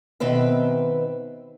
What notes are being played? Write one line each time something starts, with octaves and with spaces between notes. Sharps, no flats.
B2 D#3 C4 B4 E5